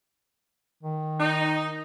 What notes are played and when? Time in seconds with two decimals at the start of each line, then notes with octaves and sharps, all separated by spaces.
0.83 D#3
1.20 D#4